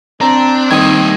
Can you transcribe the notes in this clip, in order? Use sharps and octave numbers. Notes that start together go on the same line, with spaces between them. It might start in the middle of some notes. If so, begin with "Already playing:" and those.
C4 D4 A#5
D#3 G3 A#3 D#6 G#6